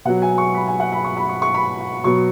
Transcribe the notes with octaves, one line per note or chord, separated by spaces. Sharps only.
B2 F#3 F#5
G#5
C#6
B5
G#5
F#5
B5
C#6
B5
C#6
C#6
B5
B2 F#3 C#6